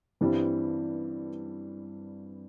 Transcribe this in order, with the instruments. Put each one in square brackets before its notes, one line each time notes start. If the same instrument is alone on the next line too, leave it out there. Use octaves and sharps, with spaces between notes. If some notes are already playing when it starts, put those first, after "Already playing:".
[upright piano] G2 E3 G3 C4